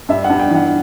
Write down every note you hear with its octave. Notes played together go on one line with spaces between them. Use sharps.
G2 E5
F#5
G2
G5
E3 F#5